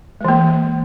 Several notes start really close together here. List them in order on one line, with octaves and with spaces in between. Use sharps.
G#3 E3 A#3